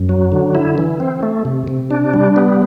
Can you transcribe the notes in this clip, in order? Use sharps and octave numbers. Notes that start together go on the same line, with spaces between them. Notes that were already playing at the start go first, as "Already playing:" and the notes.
Already playing: F#2
F#3
D3
E4
E3
C4
A3
C3
C3
D4
G3
B3